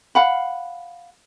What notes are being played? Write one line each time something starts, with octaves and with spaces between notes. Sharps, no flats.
F5 F#5 B5